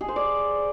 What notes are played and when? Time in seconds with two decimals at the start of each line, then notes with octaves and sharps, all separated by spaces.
0.01 G#4
0.08 C5
0.16 D5